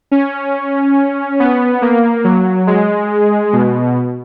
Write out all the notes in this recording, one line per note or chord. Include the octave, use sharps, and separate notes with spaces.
C#4
B3
A#3
F#3
G#3
B2